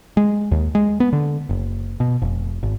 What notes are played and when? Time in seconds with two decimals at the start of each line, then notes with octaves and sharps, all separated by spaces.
0.17 G#3
0.52 D#2
0.75 G#3
1.00 B3
1.13 D3
1.49 F#1
2.00 B2
2.22 F1
2.63 G#1